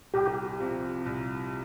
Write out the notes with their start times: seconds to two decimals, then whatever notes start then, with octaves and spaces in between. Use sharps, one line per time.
0.14 C2 G4
0.60 C3 F3
1.06 C2